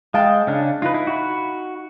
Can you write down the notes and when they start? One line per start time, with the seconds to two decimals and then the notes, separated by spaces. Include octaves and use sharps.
0.14 G#3 F5 G5 A5
0.47 C#3 C#4 D4
0.82 D#4 F4 B4
0.94 E4
1.07 F#4 B5